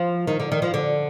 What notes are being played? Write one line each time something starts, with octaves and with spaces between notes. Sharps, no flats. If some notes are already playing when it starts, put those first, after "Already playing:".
Already playing: F3
D#3
D3
D#3
F3
D3